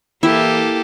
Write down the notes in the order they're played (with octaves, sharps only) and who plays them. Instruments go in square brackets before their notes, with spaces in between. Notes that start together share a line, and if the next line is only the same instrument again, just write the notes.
[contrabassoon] E3 [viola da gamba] A#3 G4 A4 [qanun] E4